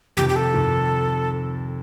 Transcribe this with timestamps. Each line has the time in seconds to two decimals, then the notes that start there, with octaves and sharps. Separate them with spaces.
0.17 F2 C3 D#3 G4
0.29 G4
0.36 A4
0.54 F2 C3 D#3